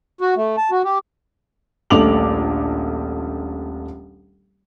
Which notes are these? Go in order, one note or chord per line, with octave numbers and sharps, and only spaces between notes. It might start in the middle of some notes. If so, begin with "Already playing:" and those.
F#4
A3
A5
F#4
G4
D#1 A#1 A3 D6 F7 F#7